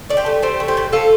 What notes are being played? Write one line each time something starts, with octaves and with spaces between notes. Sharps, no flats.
A3 D5
G4 C5
A3
A3 G4 C5
A3
G4 C5
A2
F3 F4 A4